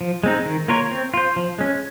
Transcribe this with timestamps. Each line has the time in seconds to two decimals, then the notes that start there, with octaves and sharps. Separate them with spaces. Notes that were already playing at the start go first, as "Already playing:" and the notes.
0.01 F3
0.23 G#3 C4 D#4
0.46 D#3
0.68 A#3 F4 A#4 C#5
0.91 C4
1.14 F4 C5
1.36 F3
1.59 G#3 C#4